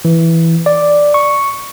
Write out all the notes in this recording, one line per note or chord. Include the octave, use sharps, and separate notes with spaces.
E3
D5
C#6